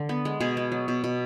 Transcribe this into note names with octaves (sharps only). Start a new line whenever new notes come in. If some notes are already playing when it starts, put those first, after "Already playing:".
Already playing: D3
B3
G#3
B2 G#4
B3
F#3
B2
B2